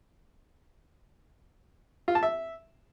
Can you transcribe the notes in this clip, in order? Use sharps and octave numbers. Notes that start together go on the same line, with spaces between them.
F4
A5
E5